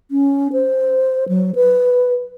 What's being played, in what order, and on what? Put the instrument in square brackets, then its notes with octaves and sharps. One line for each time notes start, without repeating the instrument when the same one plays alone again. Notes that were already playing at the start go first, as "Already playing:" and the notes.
[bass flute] C#4
C5
F#3
B4